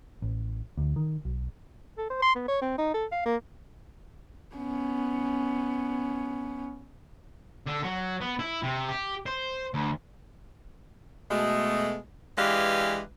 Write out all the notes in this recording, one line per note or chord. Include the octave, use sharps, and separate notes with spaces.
A1
D2
D#3
B1
A4
C5
C6
B3
C#5
C4
D#4
A4
F5
A#3
B3 C#4
D3
F#3
B3
E4
C3
G4
C5
D2
B2 G#3 A3
E3 G#3 D4 G4 B4 F5